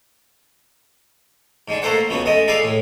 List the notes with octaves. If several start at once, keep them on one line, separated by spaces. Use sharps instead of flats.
G#2 G#3 D4
A3 A#3 A4 C5 F#5
C#2 C#3 B3 F#4
G#3 A3 D#5
G#4 A4 B4 D5 F5
A2